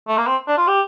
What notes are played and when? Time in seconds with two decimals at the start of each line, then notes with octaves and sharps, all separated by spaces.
0.08 A3
0.17 A#3
0.27 C4
0.48 D4
0.57 F4
0.68 G4